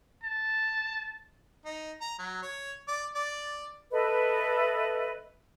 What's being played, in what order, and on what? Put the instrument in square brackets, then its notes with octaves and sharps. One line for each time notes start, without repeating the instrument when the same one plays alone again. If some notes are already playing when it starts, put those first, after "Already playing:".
[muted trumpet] A5
[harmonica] D#4
A#5
F#3
C#5
D5
D5
[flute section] A4 B4 D#5 E5